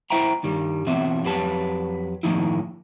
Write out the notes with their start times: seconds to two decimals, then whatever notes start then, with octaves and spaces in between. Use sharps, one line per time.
0.10 E4 C5 E5 G5 A#5
0.43 G2 D#3 G3
0.87 B2 E3 C4 F#4 E5
1.24 F2 F#3 G4 B4 A5
2.23 A2 D#3 F3 A#3 D#4 E4